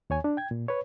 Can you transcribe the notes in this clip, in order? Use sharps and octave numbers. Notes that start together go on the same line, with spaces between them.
D#2 C#5 G#5
D4
G5 G#6
A#2
B4 C#5